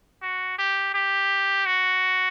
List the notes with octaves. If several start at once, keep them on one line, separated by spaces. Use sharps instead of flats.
F#4
G4
G4
F#4